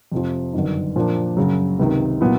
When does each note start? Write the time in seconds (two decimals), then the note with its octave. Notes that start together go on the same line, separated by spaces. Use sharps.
0.12 F2 C3 F3
0.53 G1 F#2 D#3
0.96 A#2 F3 A#3 D4
1.37 F#2 C#3 F#3
1.79 C#2 C3 D#3
2.21 A#2 F#3 B3 E4